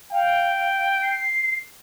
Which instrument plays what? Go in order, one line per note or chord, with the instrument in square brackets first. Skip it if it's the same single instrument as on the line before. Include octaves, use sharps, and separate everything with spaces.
[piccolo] F5 [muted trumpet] G5
[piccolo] C7